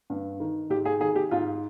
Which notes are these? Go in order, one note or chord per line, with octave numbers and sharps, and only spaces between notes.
G2
D#3
G#2 G4
G#4
D#3 G#4
G4
G#2 F4